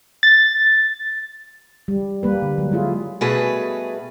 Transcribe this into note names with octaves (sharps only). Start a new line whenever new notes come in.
A6
G3
G3 A#3 B4
D3
F#3
G#3 E4 F4 G#4
B2 G3 A3 F#4 G#4 B4